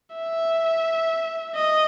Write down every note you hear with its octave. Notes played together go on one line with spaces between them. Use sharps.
E5
D#5